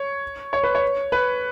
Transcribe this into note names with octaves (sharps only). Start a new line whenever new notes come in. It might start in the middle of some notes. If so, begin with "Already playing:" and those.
Already playing: C#5
C#5
B4
C#5
B4